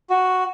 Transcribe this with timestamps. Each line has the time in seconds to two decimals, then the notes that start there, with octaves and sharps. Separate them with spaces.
0.10 F#4